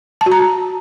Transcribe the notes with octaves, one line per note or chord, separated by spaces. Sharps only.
A5
F#4
A#5